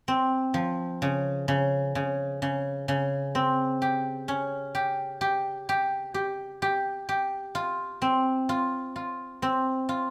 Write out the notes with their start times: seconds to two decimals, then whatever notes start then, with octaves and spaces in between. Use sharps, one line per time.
0.08 C4
0.54 F3
1.02 C#3
1.48 C#3
1.95 C#3
2.42 C#3
2.88 C#3
3.35 C4
3.82 G4
4.28 C#4
4.75 G4
5.21 G4
5.69 G4
6.14 G4
6.62 G4
7.09 G4
7.55 F4
8.02 C4
8.49 F4
8.96 F4
9.42 C4
9.89 F4